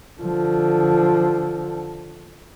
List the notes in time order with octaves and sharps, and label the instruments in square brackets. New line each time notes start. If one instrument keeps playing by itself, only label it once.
[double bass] D3 F3